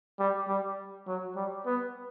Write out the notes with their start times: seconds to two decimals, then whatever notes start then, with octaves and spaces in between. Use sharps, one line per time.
0.19 G3
0.48 G3
1.07 F#3
1.36 G3
1.66 B3